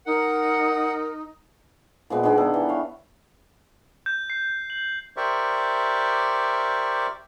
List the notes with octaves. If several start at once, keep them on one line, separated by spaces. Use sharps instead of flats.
D#4 A#4 F#5
A#2 F3 G#3 B3
D3 D#3 G#3 B3
B3 A4 G5
E3
C#5 F5
G6
C7
F#7
G4 A#4 C5 D5 E5 C#6